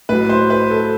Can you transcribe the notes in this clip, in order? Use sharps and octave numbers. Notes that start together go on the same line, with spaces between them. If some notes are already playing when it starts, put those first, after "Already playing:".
A2 F#3 B4
C5
B4
A4